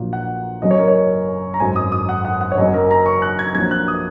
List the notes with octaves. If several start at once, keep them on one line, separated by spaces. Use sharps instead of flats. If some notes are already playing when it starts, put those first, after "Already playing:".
Already playing: A#1 A#2 F#3
F#5
F#1 F#2 F#3 D#5
C#5
A#4
C#5
A#5
G#1 F#2 F#3 G#5
D#6
D#6
F#5
F#5
F#5
C#5
F#1 F#2 F#3 D#5
A#4
A#5
C#6
F#6
G#6
A#1 A#2 F#3 G#6
F#6
D#6